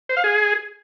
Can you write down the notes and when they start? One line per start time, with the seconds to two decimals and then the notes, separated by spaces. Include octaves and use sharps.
0.09 C5
0.17 F5
0.24 G#4